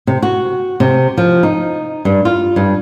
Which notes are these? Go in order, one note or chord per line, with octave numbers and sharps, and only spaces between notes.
C3
F#4
C3
F3
D#4
G2
F4
G2